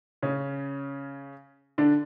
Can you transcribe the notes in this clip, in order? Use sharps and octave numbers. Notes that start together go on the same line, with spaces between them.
C#3 C#4
D3 D4